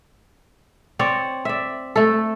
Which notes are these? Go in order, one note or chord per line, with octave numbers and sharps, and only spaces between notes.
C4 C#5 D5
D5 E5
A3 A4